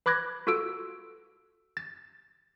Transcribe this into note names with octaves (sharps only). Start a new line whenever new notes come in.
B4 B5 D6 F#6 G#6 A#6
F4 F#4 A4 E6 D7
A6